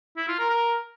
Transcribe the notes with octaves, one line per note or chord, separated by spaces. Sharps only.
E4
F4
A#4
A#4